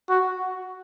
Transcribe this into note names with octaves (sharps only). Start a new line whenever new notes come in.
F#4